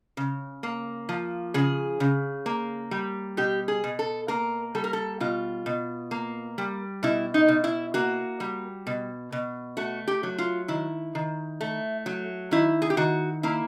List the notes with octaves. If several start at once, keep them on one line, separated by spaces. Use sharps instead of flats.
C#3
A#3
F3
C#3 G#4
C#3
A#3
G3
B2 G4
G#4
B2
A4
A#3 A#4
G3 A4
A#4
A4
B2 F4
B2
A#3
G3
B2 E4
D#4
B2
E4
A#3 F#4
G3
B2
B2
A3 F#4
G4
F#3
F4
D#3 E4
D#3
A3
F#3
D#3 E4
G#4
G4
D#3 F#4
A#3 E4